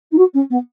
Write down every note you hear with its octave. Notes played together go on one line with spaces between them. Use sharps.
D#4
F#4
C#4
B3